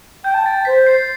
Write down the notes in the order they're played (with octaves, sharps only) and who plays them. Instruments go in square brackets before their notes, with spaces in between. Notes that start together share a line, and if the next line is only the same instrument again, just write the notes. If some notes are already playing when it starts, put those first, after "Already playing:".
[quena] G5 [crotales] G6
[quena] A5
[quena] G5 [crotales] A6
[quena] C5 [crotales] B6
[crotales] C7